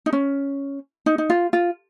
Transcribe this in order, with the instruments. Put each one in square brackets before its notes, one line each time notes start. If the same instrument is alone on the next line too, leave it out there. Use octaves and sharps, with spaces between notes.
[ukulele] D#4
C#4
D#4
D#4
F4
F4